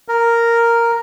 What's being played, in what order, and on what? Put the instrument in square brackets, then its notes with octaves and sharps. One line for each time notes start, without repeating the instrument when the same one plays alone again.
[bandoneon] A#4